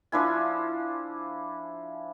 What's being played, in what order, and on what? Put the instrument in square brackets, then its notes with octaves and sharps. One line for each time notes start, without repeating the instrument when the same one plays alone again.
[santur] F3 D4 E4 G#5